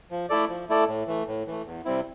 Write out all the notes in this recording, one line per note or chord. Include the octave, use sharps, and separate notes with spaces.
F3
A3 E4 A4 D5
F3
A3 E4 A4 D5
A2
E3 A3
A2
E3 A3
E2
C3 G3 C4 E4